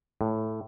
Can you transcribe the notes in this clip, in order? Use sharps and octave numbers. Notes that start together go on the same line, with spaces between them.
A2